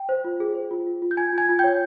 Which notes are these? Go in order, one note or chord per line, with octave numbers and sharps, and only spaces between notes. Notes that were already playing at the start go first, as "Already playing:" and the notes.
Already playing: G5
C5
F4
G#4
C5
F4
F4
F4
G6
F4 G#5 G#6
F4 G#5 G#6
F4
C#5 G5 G6